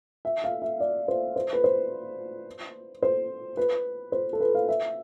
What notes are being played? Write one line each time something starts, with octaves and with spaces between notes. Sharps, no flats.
E5
F5
E5
D5
C5
C5
B4
C5
C5
B4
C5
A4
B4
F5
E5